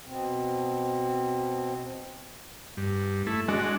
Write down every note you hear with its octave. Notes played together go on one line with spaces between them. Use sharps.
B2 C4
G2
A3 E4
G#3 D4 F#4